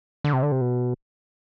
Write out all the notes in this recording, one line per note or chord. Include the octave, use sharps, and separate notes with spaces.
D3
C3
D3
C3
B2